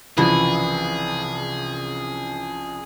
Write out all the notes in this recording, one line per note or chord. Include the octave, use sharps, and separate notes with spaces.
C2 C#3 E3 F3 G#4